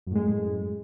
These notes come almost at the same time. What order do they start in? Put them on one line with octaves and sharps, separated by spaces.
F#2 A2 G#3